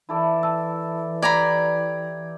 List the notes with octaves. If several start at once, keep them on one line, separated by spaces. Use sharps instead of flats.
E3 E4 A4 D5
A5 E6
G4 D5 A#5 B5 D6 G#6